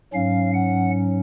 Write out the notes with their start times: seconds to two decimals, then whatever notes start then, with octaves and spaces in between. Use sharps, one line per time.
0.13 G#2 F#3 C#4 F5
0.54 F#5